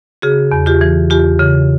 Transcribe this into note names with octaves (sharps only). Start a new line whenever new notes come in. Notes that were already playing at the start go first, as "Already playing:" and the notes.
C#3 F#4 G#4
E2
F4 G4
E3
E2 F4 G4
C#3